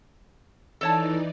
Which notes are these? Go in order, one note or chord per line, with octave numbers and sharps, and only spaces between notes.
E3 D#4 A4 C#5 D5 A5